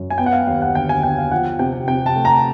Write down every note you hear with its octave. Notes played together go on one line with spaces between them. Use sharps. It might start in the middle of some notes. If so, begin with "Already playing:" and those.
Already playing: F#2
G#5
B3 G5
F#5
F5
D#2 F5
F#5
D3 G5
G#5
B3 G5
F5
F3 F#5
C3 G5
C3 G5
A5
A3
A#5